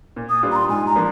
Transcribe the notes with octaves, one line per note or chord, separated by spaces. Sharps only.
A#2
D#6
G3 D4 F4
A#5
C6
G#2 G#5
A#5
F3 A#3 D4